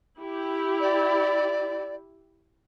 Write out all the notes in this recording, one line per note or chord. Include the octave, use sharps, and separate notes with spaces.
E4 G4
D5